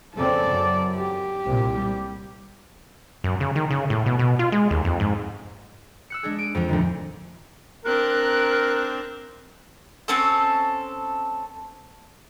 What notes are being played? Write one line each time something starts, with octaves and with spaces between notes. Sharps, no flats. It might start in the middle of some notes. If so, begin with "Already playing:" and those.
F2 C#3 C4 A4 D5
F#2
G4
C2 A#2
G3
F#2
C#3
D#3
C#3
A2
B2
B2
F4
G#3
D#2
F2
G#2
E6 F#6 C#7
G#3 D4 G#4
D7 D#7
F2 F3
D2 A2 D#3
C4 D4 A#4 F#6
C4 C#4 A4